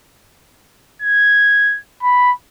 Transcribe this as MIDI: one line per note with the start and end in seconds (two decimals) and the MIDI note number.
1.02 1.78 92
2.03 2.32 83